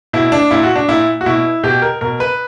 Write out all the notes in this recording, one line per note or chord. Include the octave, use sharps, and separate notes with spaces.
B2 E4
D4
A#2 E4
F#4
D4
A#2 E4
F#4
B2 E4
B2 G4
A#4
B2 A#4
B4